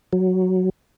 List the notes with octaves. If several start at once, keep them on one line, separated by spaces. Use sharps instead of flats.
F#3